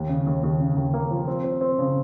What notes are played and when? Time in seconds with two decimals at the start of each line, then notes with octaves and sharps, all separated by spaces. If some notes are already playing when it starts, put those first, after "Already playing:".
Already playing: D#2
0.09 C#3
0.27 D#2
0.43 D#2
0.60 C#3
0.76 D#2
0.94 A#3
1.11 F3
1.27 C4
1.44 C4
1.61 C4
1.79 C#3